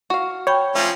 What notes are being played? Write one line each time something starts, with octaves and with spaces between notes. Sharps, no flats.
F#4 F5
C#5 G5 B5 G6
F3 A3 C4 C#4